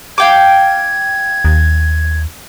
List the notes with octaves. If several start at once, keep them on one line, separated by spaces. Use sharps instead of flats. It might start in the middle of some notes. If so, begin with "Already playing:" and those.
F5 G5 D6 G#6
D#2